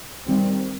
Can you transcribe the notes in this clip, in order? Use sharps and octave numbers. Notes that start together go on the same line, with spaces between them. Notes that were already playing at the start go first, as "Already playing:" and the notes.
D#3 G3 C4